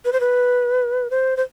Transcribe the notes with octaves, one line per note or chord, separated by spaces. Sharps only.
B4
C5
B4
C5
C5